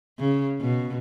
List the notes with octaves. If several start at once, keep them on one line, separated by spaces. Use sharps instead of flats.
C#3
B2